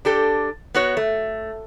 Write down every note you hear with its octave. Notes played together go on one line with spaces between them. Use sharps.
D4 G4 A4
B3 F#4 C#5
A3